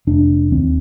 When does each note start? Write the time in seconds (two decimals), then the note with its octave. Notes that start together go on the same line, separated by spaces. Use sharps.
0.07 F1 D4
0.52 D#2 C4